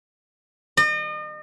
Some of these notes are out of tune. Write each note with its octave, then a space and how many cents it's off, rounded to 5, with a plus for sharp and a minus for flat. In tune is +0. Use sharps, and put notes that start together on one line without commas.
D#5 -40